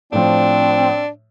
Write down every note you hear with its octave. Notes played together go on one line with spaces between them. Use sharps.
A2 F3 C4 D4